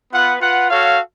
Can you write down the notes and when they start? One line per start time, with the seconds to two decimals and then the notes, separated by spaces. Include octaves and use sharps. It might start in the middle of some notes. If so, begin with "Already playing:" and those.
0.12 B3 F4 B4 F#5
0.41 F4 B4 F#5
0.70 F#4 A4 C#5 F5